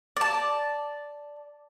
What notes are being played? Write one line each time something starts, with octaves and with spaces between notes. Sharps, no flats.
D5 A5